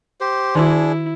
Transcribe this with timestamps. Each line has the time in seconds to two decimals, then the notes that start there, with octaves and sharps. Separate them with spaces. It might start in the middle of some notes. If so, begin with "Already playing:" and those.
0.20 G4 C5
0.55 D#3 D4 E4 F#4 G#4